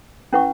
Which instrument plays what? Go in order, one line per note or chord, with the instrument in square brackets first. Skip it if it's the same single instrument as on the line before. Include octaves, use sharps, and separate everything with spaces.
[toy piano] C#4 E4 B4 F#5 C#6